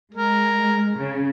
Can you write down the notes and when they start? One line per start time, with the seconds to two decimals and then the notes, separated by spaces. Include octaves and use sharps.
0.15 G#3 A#4
0.96 C#3